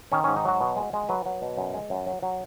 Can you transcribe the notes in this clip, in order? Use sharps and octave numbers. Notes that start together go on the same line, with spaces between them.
D#3 C#4
G#2 C#4
D#4
F#3 F#4
B2
G#3
G#3
F#3 B4
F#3
B2
F#2
G#3
F#2
F#3
F#3